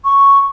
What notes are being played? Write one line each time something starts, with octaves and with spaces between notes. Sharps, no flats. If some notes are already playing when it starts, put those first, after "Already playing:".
C#6